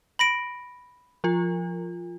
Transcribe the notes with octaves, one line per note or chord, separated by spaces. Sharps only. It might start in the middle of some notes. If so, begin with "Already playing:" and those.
B5 A#6 D7
F3 F4